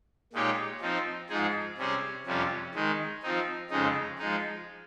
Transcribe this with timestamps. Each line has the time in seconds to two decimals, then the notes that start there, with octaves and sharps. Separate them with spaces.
0.33 A#2 G#3 D#4 G4 C#5
0.81 F3 C4 D#4
1.29 G#2 F3 G#3 D#4 G#4
1.77 C3 G3 C#4 G#4 C5
2.26 F2 C3 G3 C#4 F4
2.74 D#3 G#3 D#4
3.23 F3 C4 D#4
3.70 F2 C#3 G#3 D#4
4.19 F3 G#3 D#4